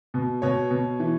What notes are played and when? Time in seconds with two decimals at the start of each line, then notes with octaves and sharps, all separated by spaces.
0.14 B2
0.42 B2 C#5
0.71 B2
1.00 E3